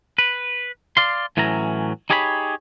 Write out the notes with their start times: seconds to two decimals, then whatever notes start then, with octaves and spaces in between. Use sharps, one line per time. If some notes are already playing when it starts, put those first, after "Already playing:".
0.18 B4
0.97 D5 F5 C6
1.37 A2 E3 F#3 C#4 A#5
2.10 D#4 G4 G#4 C#5 F5 B5